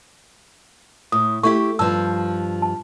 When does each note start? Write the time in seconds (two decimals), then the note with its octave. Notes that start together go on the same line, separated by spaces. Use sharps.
1.12 A2 D#6
1.43 A3 E4 G4 C#6
1.79 G2 F3 A5 E6
2.62 A5